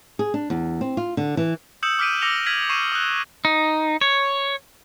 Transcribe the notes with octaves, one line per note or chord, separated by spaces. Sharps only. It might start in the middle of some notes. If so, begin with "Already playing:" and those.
G#4
D4
E2
C4
F4
D3
E3
D#6 E6 G6 C#7 E7 F#7
D6 F6 G6 B6 D7 D#7
D6 E6 A#6 C#7 F7 G7
F6 G#6 B6 D#7 F#7
C#6 C7 D#7 E7
D#6 F#6
D#4
C#5